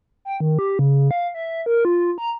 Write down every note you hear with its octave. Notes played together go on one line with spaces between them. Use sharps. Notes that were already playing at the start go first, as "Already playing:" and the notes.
G5
D#3
G4
C#3
F5
E5
A#4
F4
A#5